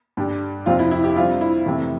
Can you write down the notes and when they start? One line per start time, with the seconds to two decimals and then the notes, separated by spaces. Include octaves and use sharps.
0.17 G2 D3 G3
0.66 F2 C3 F3 C4 F4
0.79 E4
0.91 E4
1.04 G4
1.16 D3 G3 C4 F4
1.41 E4
1.66 F2 C3 E3 A3